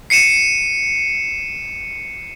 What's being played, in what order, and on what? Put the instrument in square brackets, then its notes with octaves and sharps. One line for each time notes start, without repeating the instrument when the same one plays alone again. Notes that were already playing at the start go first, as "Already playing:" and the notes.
[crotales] C7 C#7 D#7 E7